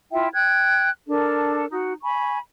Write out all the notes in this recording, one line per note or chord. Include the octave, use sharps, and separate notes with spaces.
E4 F4 E5 G5
G5 F#6 G#6
D4 A4 A#4
D#4 F#4
G#5 B5 C#6